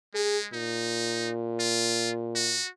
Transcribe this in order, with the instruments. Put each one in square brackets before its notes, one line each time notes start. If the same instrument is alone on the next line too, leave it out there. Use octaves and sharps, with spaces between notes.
[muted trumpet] G#3 [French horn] G#4
[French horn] A#2 [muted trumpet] D#4
[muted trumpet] F4
F#4